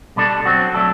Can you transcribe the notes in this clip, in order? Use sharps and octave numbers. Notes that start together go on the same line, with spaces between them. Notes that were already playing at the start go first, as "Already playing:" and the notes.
B2 G3 D4 A4
F#3 C4 F#4
F#3 A3 D4 A4